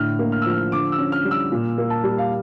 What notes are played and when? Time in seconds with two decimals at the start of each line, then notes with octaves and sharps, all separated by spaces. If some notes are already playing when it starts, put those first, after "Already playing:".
Already playing: A2 D3 F6
0.19 A#3
0.32 F6
0.42 E6
0.46 F3 F6
0.72 D3 D6
0.92 E6
0.99 C#4
1.12 F6
1.24 G3
1.31 E6
1.52 A#2
1.78 A#3
1.90 A5
2.04 G3
2.18 F5